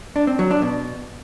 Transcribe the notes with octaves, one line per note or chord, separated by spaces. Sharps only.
D4
C4
F#3
D4
B2